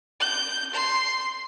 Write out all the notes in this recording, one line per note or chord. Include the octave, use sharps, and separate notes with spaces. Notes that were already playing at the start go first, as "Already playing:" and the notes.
G6
C6